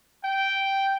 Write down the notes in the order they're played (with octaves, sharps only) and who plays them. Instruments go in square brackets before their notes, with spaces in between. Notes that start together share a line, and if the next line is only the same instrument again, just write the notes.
[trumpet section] G5